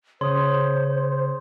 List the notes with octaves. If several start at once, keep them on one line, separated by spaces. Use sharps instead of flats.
C#3 C5 C#5 C6 D#6